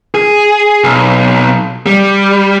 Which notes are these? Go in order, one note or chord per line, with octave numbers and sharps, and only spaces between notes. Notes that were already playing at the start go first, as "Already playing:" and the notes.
G#4
B1
G3